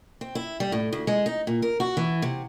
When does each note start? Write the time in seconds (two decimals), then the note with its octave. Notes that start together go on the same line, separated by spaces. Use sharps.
0.21 C4
0.35 E4
0.60 G3
0.72 A2
0.93 D2
1.07 G#3
1.26 D#4
1.47 A#2
1.62 A#4
1.80 F#4
1.97 E3
2.22 C3